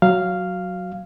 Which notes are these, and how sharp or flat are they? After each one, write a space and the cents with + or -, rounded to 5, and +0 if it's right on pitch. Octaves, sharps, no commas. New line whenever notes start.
F#3 +0 F5 -5